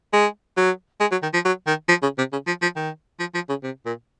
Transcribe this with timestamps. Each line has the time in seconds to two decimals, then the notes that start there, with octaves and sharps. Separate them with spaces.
0.13 G#3
0.57 F#3
1.00 G#3
1.11 F#3
1.23 D#3
1.33 F3
1.45 F#3
1.67 D#3
1.88 F3
2.02 C#3
2.18 C3
2.32 C#3
2.47 F3
2.62 F3
2.76 D#3
3.19 F3
3.34 F3
3.49 C#3
3.63 C3
3.86 A#2